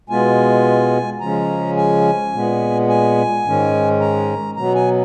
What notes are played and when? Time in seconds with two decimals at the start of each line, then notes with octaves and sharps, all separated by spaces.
0.09 B2 G#3 B3 F4 G#5
1.20 C#3 F3 G#3 C#4 A#5
1.77 G#5
2.33 A#2 G#3 B3
2.88 G#5
3.45 G#2 D#3 G#3 C#4
4.00 A#5
4.56 B2 F#3 B3 A#5
4.75 G#5